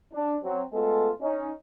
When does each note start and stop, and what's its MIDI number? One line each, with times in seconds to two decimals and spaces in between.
0.13 0.36 62
0.43 0.61 54
0.43 0.61 60
0.73 1.10 56
0.73 1.10 57
0.73 1.10 59
0.73 1.10 65
0.73 1.10 68
0.73 1.10 69
1.21 1.50 61
1.21 1.50 63